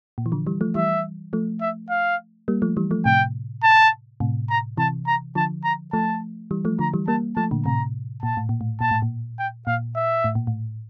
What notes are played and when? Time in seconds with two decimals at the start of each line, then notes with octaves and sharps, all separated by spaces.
0.18 A#2
0.26 E3
0.32 D3 F3
0.47 E3 G3
0.61 F3 A3
0.75 E3 G3 E5
1.33 F3 A3
1.61 E5
1.90 F5
2.48 G3 A#3
2.62 F3 A3
2.77 E3 G3
2.91 F3 A3
3.05 A2 C3 G5
3.63 A5
4.20 A2 C3
4.50 A#5
4.77 C3 E3 A5
5.07 A#5
5.35 D3 F3 A5
5.64 A#5
5.93 F3 A3 A5
6.51 E3 G3
6.65 F3 A3
6.79 D3 F3 A#5
6.94 E3 G3
7.08 G3 A#3 A5
7.36 F3 A3 A5
7.51 A#2 D3
7.65 A2 C3 A#5
8.23 A#2 A5
8.37 A2
8.49 A#2
8.61 A2
8.81 A#2 A5
8.91 A2
9.02 A#2
9.39 G5
9.67 A#2 F5
9.96 E5
10.24 A2
10.35 A#2
10.47 A2